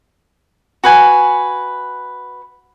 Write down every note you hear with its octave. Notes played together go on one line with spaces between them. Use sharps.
F#4 B4 G#5